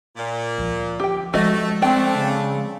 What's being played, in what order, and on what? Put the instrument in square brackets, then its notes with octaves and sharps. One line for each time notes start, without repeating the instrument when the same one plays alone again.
[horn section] A#2
[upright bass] D2 F3
[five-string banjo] G4 G5
[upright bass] F3 G#3 [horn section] A3 [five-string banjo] F#4 D#5
[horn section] A3 D4 [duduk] C4 [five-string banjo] G5
[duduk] C#3